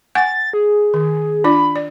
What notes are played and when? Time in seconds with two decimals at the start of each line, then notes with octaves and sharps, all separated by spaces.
0.15 F#5 G#5 A6
0.53 G#4
0.94 D#3
1.44 D4 F4 D5 B5
1.76 D5